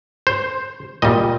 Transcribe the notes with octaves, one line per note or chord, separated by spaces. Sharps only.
C5
A#2 G3 D#5